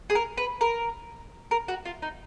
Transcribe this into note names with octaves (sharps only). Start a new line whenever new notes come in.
G#4
A#4
B4
A#4
A#4
F#4
F4
D#4